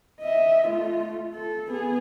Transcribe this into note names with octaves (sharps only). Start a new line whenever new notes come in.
D#5 E5
A3 F4
A4
B3 G#4